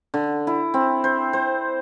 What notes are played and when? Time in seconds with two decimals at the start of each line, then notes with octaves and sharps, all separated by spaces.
0.14 D3
0.47 E4
0.74 C4
1.04 C5
1.33 C5